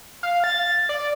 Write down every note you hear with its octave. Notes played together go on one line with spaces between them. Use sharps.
F5
A6
D5